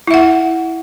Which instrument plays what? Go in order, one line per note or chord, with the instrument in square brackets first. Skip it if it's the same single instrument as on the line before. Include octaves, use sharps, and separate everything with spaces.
[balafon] E4
E5
F#5